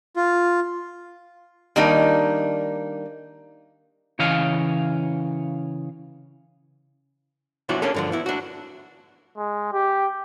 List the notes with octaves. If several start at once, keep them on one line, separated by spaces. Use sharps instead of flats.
F4
D#3 G3 A#3 D4 D#4
C#3 E3 C#5 D#5 F5
B1 B2 F3 D4 E4 F#4
A#3 C#4 D4 G#4 A4
G2 D3 F3
B3 E4
D4 F#4
G#3
G4